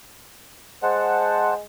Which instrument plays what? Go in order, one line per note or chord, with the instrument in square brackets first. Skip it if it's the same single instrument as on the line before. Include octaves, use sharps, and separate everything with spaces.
[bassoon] G#3 [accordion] C5 F#5 A5